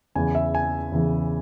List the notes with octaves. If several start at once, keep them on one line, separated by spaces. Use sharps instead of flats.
E2 C#3 E3 G#5
E5
G#5
E2 C#3 E3